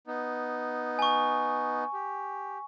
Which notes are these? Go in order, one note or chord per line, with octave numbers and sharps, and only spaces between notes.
B3 D#4
G#5 C#6
G4